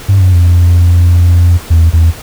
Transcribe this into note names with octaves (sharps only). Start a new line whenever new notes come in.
G2
F#2
F2
E2
E2